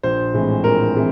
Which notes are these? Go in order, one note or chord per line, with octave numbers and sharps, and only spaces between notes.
A#1 C5
A2 E3 G#3 C4
A#1 A#4
E3 G#3 C4